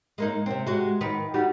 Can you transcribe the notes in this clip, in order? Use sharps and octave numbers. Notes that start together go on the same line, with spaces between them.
G#3 A#3 D#4
C3 C4
G#3 F#4
D#3 B4
G3 D#4 F#4